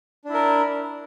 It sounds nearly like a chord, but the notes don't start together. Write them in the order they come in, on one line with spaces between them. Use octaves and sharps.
D4 E4 A#4